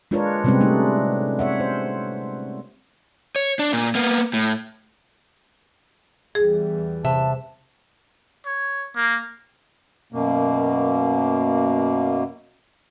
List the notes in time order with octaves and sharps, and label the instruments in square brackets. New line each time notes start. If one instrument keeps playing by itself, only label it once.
[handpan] G#3 D4 F4 A#4 B4 C#5
C3 G3 G#3 C4 C#4 B4
G3 A3 D4 D#4
C#5 E5 F#5
C5
[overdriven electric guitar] C#5
D4
A#2
A#3 B3
A2
[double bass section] E2 E3 G3 [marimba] G#4
[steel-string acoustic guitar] C3 E5 [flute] A5
[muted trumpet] C#5
A#3
[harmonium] F#2 B2 A#3